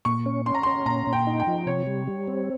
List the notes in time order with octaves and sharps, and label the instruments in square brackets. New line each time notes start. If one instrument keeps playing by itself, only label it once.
[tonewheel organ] A#2 [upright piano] C#6
[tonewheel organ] C#4
[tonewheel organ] C#4 [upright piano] C6
[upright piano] A#5
[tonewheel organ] C#4 [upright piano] C6
[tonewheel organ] A#2 [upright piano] A#5
[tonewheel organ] A#2
[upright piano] G5
[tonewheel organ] D#4
[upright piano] G5
[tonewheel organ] F3
[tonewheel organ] C3 [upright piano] C#5
[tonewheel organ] G3
G3
C4